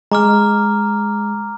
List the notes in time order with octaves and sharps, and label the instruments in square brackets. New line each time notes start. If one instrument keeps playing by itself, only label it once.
[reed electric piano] G#3 [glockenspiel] A#5 D6 F6